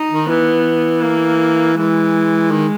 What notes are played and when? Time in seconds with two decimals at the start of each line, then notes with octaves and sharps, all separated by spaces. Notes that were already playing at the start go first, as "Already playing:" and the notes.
Already playing: D#4
0.11 D#3
0.29 E3 B3
1.04 A#3
1.78 E3 G#3
2.52 D#3